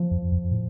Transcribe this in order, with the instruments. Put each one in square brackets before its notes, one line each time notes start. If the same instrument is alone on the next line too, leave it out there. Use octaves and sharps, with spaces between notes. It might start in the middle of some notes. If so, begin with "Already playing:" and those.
Already playing: [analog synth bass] F3
[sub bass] F2
F2
A2